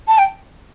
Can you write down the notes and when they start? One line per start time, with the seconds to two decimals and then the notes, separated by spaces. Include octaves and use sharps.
0.08 A5
0.18 G5